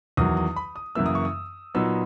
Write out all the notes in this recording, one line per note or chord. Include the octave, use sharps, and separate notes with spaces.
E2 D#3 F#3 D#6
D#6
B5
D#6
F#2 C#3 E3 A#3 E6
D#6
C#6
D#6
A#2 F#3 B3 D#4 E6